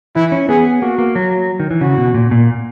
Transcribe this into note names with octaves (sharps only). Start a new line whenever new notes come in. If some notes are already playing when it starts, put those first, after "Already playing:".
E3 E4
C#4
B3 G#4
A#3 F#4
A#3
F#3
D#3
E3
C#3 F#4
B2
A#2
A#2